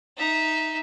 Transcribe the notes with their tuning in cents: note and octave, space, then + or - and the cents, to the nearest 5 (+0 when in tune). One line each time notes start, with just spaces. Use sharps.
D#4 +0 E5 -15